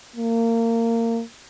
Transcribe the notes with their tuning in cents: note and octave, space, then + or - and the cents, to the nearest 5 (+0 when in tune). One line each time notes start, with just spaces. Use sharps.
A#3 -25